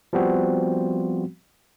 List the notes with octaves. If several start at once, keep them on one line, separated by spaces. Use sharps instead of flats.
F3 G3 B3 C4 F#4